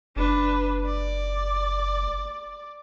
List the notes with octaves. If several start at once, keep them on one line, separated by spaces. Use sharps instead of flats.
F#1 D4 B4
D5